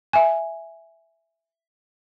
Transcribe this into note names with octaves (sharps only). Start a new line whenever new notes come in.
E5 G#5